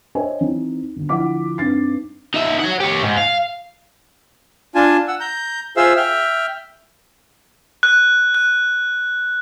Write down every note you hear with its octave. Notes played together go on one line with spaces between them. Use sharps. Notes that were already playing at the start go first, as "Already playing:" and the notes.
C5 C#5 D#5 E5 G5 G#5
E3 C4 D#4
G1 D2
D2 F3 E4 F#5 D6 B6
G2 C4 D#4 A6 C7
D#4 E5
C#5 F#5
G4 C#5
G#2
F5
D4 F4 G#5 A5
F#5 E6
A#5 G6
F4 G#4 C5 E5 F5 E6
E5 G5 F6
F#6
F#6